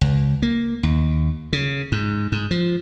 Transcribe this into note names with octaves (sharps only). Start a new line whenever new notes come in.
C#2
A#3
D#2
C#3
G#2
G#2
F3